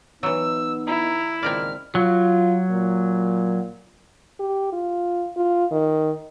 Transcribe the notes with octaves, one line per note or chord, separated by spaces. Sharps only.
E3 F#3 B3 D#4 E6
E4 A#5
C#2 A#2 D#3 C4 A#4 D5 F6
F#3 F4
A#2
G4
F4
F4
D#3